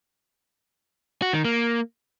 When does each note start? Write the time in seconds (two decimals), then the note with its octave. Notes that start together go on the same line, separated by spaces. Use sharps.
1.22 F#4
1.33 D#3
1.45 A#3